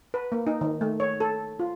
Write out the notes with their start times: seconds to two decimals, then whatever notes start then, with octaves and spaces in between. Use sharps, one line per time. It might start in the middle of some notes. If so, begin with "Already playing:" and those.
0.14 B4
0.32 A#3
0.47 D#4
0.61 D#3
0.81 A3
1.00 C#5
1.20 A4
1.60 F4